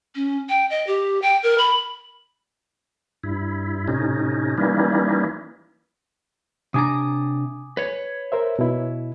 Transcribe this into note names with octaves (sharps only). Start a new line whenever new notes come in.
C#4
G5
D#5
G4
G5
A#4
B5
G2 E4
A2 C3 C#4 D#4
E3 G3 A#3 C#4 D#4 E4
C3 D4 G#5 A#5 D6 D#6
B4 C#5
A#4 C5 E5
B2 E4